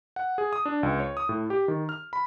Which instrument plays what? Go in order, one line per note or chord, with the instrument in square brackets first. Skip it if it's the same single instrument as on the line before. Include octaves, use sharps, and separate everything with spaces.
[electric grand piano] F#5
G#4
D#6
D4
C#2
C#5
D#6
A2
G4
D#3
F6
B5